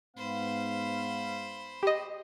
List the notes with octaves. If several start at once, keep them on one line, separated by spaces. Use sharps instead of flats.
G#2 B3 C5 F5 B5
G4 D#5